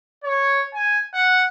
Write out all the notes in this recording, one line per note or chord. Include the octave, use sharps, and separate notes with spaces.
C#5
G#5
F#5